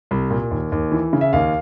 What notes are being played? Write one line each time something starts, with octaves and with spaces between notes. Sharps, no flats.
C2
A#2
D#2
D#2
E3
C#3
E5
D#2 F5